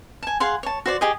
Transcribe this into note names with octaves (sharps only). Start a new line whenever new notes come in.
G#5 A5
G#4 F5 F#5 C6
C#5 A5
F#4 C5 D5
G4 G#4 D#5